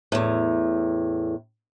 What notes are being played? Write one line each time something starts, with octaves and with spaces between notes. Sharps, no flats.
E2 A2